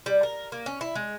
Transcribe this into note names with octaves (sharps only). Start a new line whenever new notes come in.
G3
A#4
A#3
C#4
E4
G#3